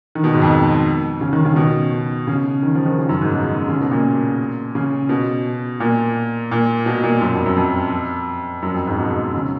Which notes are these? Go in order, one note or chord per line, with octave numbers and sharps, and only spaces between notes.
D#3
B2
G#2
F2
C#3
D#3
C#3
B2
C#3
D#3
F3
D#3
C#3
F#2
G#2
B2
C#3
B2
A#2
C#3
B2
A#2
A#2
B2
A#2
F#2
F2
F#2
F2
F#2
F2
G#2
B2
C#3